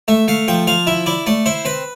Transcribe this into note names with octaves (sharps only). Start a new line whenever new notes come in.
A3 E5
A3 F5
F3 G5
F3 F5
E4 E5
E4 D5
A3 D5
E4 C5
C4 B4